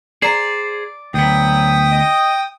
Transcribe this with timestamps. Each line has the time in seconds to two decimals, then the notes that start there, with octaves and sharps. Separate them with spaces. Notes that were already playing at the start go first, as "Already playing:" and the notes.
0.22 G#4 C5 D5 A#5
1.14 D2 F#3 B3 G5 D#6
1.92 D#5